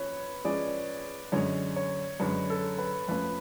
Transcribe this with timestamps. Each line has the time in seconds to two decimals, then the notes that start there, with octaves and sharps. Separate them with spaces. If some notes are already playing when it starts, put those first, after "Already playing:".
Already playing: F3 C#4 B4 C#5
0.44 F3 G#3 C#4 G#4 D5
1.32 F#2 D3 G#3 C#4 C#5
1.76 C#5
2.20 F#2 D3 G#3 C#4 B4
2.50 A4
2.78 B4
3.08 F2 F3 A3 C#4 F4 B4